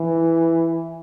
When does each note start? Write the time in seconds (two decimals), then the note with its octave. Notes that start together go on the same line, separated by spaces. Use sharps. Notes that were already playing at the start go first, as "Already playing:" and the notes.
Already playing: E3